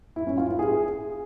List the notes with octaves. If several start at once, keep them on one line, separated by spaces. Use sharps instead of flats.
E4
C#4
F4
E4
G#4